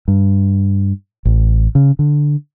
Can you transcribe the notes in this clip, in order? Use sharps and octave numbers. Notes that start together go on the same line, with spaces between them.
G2
A1
C#3
D3